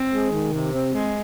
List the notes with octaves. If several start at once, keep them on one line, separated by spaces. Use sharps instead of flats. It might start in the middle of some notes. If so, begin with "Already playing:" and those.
Already playing: C4
G#3
D#3
C3
C4
G#3